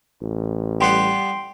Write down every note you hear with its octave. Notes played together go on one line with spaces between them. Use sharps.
A1
G3 B3 F#5 G5 C6 C7